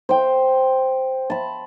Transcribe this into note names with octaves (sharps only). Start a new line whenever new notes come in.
C5 G5
A5 B5